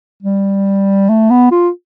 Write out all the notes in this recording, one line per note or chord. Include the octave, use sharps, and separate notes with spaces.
G3
A3
B3
F4